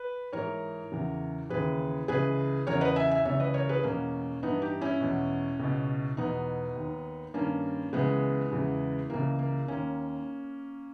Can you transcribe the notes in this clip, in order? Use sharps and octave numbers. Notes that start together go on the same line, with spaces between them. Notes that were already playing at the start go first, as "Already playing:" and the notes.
Already playing: B4
G#2 E3 A#4 C#5
E2 C#3 E3
D#2 C#3 E3 G#4 B4
C#2 C#3 E3 G#4 B4
E2 C#3 E3 A#4 C#5
B4 D#5
E5 G#5
E5 G#5
C#2 C#3 E3 C#5 E5
B4 D#5
A#4 C#5
G#4 B4
E2 B2 A#3 C#4
G2 E3 B3 D#4
D#4 G4
C#4 E4
E2 B2
C#2 B2
E2 B2 B3 D#4
D#2 D#3
G2 D#3 A#3 C#4
C#2 C#3 E3 G#3 B3
E2 C#3 E3
C#2 C#3 E3 A#3
A#3
D#2 D#3 A#3 C#4